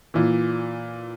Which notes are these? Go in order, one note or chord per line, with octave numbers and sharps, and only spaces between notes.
A#2 E3